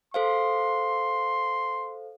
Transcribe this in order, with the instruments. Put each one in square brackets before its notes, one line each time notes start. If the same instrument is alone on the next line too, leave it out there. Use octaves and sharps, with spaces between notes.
[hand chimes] A4 C5 F5 [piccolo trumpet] C6